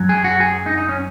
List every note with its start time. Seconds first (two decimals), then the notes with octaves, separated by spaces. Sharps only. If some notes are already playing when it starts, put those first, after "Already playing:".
Already playing: F#2 F#3
0.09 G#4
0.24 F#4
0.40 G#4
0.66 D#4
0.77 D#4
0.89 C#4